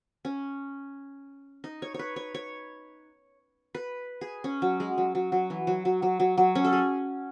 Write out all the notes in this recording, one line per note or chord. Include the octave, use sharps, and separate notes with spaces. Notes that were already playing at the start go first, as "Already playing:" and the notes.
C#4
D#4
C#5
B4 C#5
C#5
C#5
B4
G#4
C#4
F#3
G#3
F#3
F#3
F#3
E3
F#3
F#3
F#3
F#3
F#3
C#4
A4
G#4